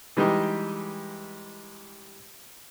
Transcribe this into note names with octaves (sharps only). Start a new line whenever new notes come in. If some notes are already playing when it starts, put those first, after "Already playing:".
E3 G3 G#3 D#4 G4